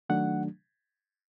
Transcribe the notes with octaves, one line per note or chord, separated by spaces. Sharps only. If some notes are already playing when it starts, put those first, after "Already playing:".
D#3 F#3 A3 D4 F#5